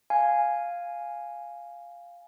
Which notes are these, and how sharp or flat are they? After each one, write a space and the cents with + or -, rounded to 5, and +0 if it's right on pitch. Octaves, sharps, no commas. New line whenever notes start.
F5 +0 G#5 +0